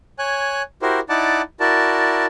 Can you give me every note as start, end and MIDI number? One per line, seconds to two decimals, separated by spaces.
0.19 0.62 73
0.19 0.62 80
0.19 0.62 90
0.82 1.00 64
0.82 1.00 66
0.82 1.00 67
0.82 1.00 70
0.82 1.00 72
1.09 1.42 63
1.09 1.42 64
1.09 1.42 74
1.09 1.42 78
1.09 1.42 81
1.09 1.42 86
1.60 2.26 64
1.60 2.26 66
1.60 2.26 70
1.60 2.26 74
1.60 2.26 81